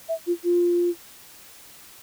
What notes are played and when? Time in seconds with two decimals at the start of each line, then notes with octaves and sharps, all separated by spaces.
0.09 E5
0.27 F4
0.44 F4